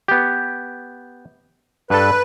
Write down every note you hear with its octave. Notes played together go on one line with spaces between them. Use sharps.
B3 G4
G2 A4 B4